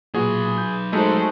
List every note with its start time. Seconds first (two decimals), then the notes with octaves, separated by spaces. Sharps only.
0.14 A#2 F#3 F#4 G#4 B4
0.58 G6
0.92 G#3 A3 D#4 F#4 A4 C5